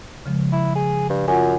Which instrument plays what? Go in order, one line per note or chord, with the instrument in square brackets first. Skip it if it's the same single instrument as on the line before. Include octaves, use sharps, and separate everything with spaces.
[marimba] C#3 F3 G#3
[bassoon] E4
G#4
G2
[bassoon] F#2 [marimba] F4 F#5 G#5